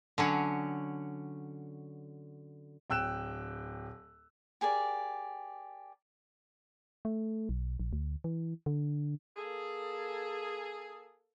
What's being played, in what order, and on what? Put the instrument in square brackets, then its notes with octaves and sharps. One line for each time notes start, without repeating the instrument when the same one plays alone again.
[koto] D3 F#3 C#4
[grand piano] D1 G5 E6 F#6 E7
[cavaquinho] G4 G#4 A#4 D5
[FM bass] A3
B1
A#1
D2
E3
D3
[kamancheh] A#3 A4 [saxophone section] G#4